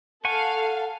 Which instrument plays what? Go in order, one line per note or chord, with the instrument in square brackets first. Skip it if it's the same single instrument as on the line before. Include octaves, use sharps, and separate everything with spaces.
[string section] A4 F5 [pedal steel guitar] F#5 G#5 C#6 [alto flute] A5